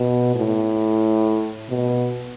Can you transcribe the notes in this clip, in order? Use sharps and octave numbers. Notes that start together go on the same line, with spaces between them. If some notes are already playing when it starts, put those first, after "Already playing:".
Already playing: B2
A2
B2